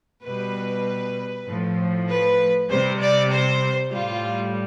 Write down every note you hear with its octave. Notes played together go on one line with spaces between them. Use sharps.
B2 G3 B4
A2 F3
B4
C3 G3 C5
D5
C5
A2 G3 F4